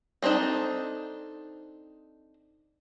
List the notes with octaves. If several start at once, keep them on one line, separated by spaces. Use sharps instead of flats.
G3 C4 D4 D#4 A4